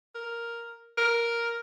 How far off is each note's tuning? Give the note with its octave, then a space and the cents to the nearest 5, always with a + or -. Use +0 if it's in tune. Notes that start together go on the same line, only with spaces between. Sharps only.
A#4 +0
A#4 +5